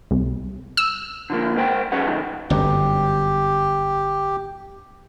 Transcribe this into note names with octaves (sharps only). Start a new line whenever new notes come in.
C2
E6
D3 F3 A#3
G#3 A#4 C5 F#5 G5
B1 F#3 C#4 G#4 B4 F#5
B2 D#3 E3 F#3
G1 F#2 G4